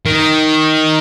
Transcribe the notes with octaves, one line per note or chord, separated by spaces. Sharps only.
D#3